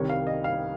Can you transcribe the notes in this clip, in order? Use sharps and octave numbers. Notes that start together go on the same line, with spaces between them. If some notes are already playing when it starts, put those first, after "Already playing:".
Already playing: C2 C3 D#3 C#5
F5
D#5
F5